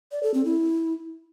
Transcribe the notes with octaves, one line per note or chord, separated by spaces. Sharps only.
D5
A4
C4
E4